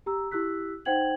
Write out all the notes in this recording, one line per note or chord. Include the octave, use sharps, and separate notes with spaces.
G4 A#5 E6
E4 G4 E6 F#6 B6
D#4 C5 F#5 G5 G#6 F#7